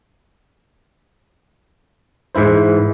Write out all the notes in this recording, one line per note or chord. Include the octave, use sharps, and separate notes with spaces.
G#2 E3 E4 C5